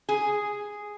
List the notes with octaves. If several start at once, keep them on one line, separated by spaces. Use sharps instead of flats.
G#4